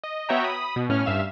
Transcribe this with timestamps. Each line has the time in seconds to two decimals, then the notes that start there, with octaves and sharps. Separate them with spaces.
0.03 D#5
0.29 B3 F#4 C#5 E5 G5 A#5
0.44 B5 D#6
0.76 B2
0.89 A2 C#4 F6
1.05 G2 E5 F5 E7